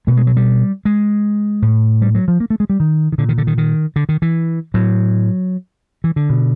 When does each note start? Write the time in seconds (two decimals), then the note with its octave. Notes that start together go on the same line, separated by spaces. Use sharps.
0.07 B2 A3
0.17 G#3
0.27 F#3
0.37 G3
0.85 G#3
1.62 A2
2.02 G3
2.15 F#3
2.28 F3
2.40 A#3
2.50 A3
2.60 G#3
2.70 G3
2.80 D#3
3.12 D#3
3.18 A#2 D3
3.29 D#3
3.38 D3
3.47 D#3
3.58 D#3
3.96 D3
4.09 D#3
4.22 E3
4.74 A2 F#3
6.04 E3
6.16 D3
6.30 B2